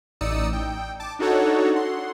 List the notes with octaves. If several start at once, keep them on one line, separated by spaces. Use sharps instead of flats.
A1 D#4 D5 D#6 E6 C#7
G5
A5 D6
D4 D#4 F#4 A4 C#5 F#5
F#5 C6